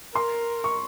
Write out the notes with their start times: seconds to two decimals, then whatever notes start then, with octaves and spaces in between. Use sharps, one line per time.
0.15 A#4 C6
0.64 C#6